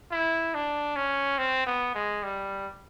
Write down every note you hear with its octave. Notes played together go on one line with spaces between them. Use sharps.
E4
D4
C#4
C4
B3
G#3
G3